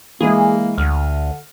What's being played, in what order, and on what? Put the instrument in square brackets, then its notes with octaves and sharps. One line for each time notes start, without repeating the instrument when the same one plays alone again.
[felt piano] E3 G#3 [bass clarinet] A#3 [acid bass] G#4
[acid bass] D2 [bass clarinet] D3 [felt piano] F6